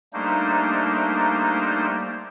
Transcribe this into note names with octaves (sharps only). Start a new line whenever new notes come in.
G3 A3 A#3 D4 D#4 C5